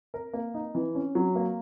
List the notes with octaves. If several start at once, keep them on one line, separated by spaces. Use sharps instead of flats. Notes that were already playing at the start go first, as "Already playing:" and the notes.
A#4
A#3
D#4
E3
C#4
F#3
A#3